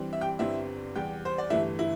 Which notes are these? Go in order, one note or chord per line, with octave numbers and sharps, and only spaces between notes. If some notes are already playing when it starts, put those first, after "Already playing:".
Already playing: G2 E3 G3 C4
E5
G4 G5
G1 G2 G3 C4 E4 E5
E2 C3 G3 G4 G5
C5
D5
G1 G2 E3 A3 E4 E5
E4